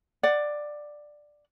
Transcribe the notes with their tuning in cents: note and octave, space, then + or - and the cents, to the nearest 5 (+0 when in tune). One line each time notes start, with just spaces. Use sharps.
D5 +10 F#5 +0